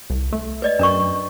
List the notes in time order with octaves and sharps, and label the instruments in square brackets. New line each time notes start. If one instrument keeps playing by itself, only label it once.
[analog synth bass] C2
A3
[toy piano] B4 D5 D#5
[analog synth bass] F#2 [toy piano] D4 A#4 C#6